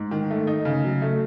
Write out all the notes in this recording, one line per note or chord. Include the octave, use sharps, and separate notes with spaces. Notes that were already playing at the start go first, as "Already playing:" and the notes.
Already playing: G#2
D#3
A3
D#4
C#3
F#3
A3